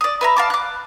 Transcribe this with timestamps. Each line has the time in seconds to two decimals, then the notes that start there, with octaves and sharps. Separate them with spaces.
0.01 D5 D#6
0.21 B4 E5 A#5
0.36 F5 A5 D6
0.50 D6 F#6